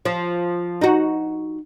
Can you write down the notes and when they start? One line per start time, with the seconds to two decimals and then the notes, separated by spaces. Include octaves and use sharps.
0.05 F3
0.81 D#4 F#4